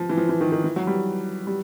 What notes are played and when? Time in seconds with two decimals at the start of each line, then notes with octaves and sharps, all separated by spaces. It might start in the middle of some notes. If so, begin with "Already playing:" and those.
Already playing: F3
0.10 E3
0.17 F3
0.29 E3
0.41 D#3
0.52 D#3
0.64 E3
0.76 F#3
0.87 G3
1.47 G3